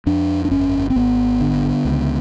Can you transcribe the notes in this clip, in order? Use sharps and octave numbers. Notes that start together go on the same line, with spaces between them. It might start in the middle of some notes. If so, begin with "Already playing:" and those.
F2 D4
D4
G1 C#4
C4
G#1 B3
D3
C#2